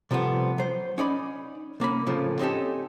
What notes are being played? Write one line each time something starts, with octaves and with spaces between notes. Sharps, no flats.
C3 F3 G3 A3 B3
F#3 C5
C#4 D#4 D5 B5
C2 A#3 C#4 B5
A2 C#3 F3 F#3
C4 C#4 D#4 G4 A4